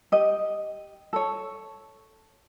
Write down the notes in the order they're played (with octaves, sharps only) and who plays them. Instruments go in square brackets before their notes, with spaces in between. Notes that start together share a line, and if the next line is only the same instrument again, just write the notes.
[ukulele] G4 D#5
A4 C#5